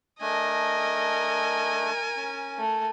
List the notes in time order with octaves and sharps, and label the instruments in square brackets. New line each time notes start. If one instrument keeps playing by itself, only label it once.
[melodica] A3 D4 [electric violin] A#4 G#5 [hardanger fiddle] D#5
[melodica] C#4
[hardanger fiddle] A3